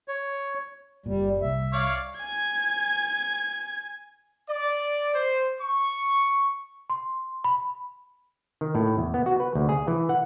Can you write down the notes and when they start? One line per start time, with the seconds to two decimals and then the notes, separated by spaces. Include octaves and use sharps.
0.08 C#5
1.06 F#1 A#2 G3
1.42 C2 E5
1.73 C#5 D5 F5
2.19 G#5 G#6
4.49 D5
5.14 C5
5.60 C#6
6.90 C6
7.44 B5
8.61 D#3
8.75 A2
8.98 E2
9.14 B3
9.26 F#4
9.40 B4
9.55 D2
9.69 G#4
9.88 E3
10.09 F#5